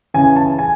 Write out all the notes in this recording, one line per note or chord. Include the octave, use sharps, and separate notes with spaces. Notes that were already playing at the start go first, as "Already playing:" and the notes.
C#3 E3 G#5
A5
G#5